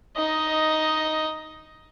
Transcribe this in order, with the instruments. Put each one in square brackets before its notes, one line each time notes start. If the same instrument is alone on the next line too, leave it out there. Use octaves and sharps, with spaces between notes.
[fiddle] D#4 D#5